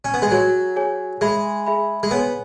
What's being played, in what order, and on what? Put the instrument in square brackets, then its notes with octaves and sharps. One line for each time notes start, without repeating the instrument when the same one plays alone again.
[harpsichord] C#4
B3
G#3
[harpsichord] F#3 [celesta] G#4 C#5 G#5
[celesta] G#4 C#5 G#5
[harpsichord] G#3 [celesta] G#4 E5 B5
[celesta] G#4 E5 B5
[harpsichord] G#3
[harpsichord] B3 [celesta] G#4 C#5 G#5